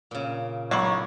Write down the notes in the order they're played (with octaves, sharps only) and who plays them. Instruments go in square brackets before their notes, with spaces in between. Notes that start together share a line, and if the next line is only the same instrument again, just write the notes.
[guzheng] A#2 C#3
[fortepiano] B1 [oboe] C#5 [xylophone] B5 C#6 D6